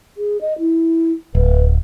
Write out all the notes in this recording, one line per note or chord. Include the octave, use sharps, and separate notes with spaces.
G#4
D#5
E4
D1 B4